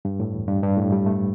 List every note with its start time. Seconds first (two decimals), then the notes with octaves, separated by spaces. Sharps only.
0.05 G2
0.20 A2
0.33 E2
0.48 G2
0.63 G2
0.77 A2
0.92 G3
1.06 A3